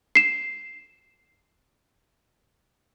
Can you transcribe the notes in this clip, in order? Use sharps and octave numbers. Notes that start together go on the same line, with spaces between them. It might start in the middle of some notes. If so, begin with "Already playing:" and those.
C7 E7